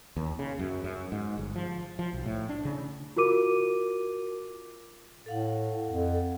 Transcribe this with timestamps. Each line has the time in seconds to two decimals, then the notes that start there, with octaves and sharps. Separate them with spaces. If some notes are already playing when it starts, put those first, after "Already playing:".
0.16 D#2
0.39 C#3
0.59 F#2
0.84 F#2
1.12 G#2
1.38 G1
1.56 F3
1.99 F3
2.13 B1
2.26 A2
2.49 D4
2.65 C#3
3.16 F4 F#4 A#4 D6 D#7
5.26 A2 A4 F5 F#5
5.89 F2
6.14 A4